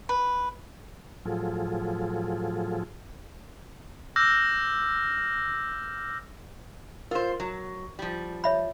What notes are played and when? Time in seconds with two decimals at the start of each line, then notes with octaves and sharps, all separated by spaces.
0.09 B4
1.25 A2 F3 F#3 F4 G#4 A4
4.16 D6 E6 F6 G6 A#6
7.11 F4 A#4 C5
7.40 F#3
7.99 F3 G3
8.44 C#5 E5 B5